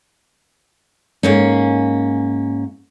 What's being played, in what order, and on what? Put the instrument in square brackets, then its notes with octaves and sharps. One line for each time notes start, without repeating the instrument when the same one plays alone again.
[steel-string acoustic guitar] G#2 A#3 C#4